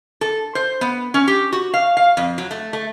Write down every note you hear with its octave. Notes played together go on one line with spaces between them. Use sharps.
A4
C5
B3
C#4
G4
F#4
F5
F5
F2
F#3
A3
A3